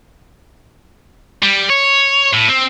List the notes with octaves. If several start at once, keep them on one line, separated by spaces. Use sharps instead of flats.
G3
C#5
A2
C4